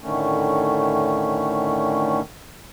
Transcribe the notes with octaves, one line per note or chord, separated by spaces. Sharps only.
A2 D3 D#3 A3 C#4